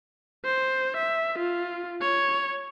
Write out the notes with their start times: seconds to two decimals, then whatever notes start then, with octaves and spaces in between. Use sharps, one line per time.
0.45 C5
0.97 E5
1.39 F4
2.01 C#5